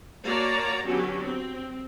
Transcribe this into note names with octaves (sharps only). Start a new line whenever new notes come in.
A#3 F#4 C#5 D5 A5 A#5
D3 F#3 B3 C#4 F#4 G4
C4